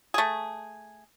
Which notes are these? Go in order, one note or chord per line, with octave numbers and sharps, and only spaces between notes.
A3 G#4